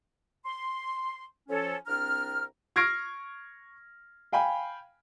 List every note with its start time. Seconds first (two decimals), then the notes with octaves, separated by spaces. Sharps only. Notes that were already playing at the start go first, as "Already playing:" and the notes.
0.45 C6
1.49 F3 C#4 A4 C#5
1.86 C2 C4 D4 A#5 F6
2.76 C#6 F6 G#6 A#6 C7 D7
4.32 F5 G5 G#5 B5